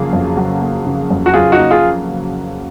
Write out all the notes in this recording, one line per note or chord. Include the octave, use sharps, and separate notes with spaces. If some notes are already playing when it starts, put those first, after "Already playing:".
Already playing: F2 C#3 F#3 A#3 F4 G#4
F2
F#3
A#3
C#3
F2
F#4
F#3 F4 G#4
D#4 F#4
A#3
F4 G#4